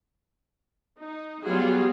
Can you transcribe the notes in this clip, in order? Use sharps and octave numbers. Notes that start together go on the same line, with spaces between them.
D#4
F#3 G3 B3 F4 F#4 G#4